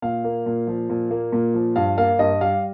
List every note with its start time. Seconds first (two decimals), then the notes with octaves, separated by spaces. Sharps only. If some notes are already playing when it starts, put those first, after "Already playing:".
0.02 A#2 F5
0.24 A#3
0.46 A#2
0.67 F3
0.90 A#2
1.11 A#3
1.32 A#2
1.54 F3
1.76 G2 F5
1.98 A#3 F5
2.19 G2 D#5
2.41 G3 F5